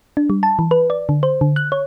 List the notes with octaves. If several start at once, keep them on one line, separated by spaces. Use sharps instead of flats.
D4
G3
A5
E3
B4
D5
D3
C5
D3
F#6
C#5